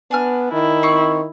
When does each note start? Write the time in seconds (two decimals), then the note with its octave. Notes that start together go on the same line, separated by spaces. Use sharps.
0.11 B3 D4 G#5 F6
0.52 D#3 E4
0.83 C4 C#6